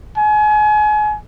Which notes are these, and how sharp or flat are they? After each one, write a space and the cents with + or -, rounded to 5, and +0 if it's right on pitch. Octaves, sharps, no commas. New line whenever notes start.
G#5 +35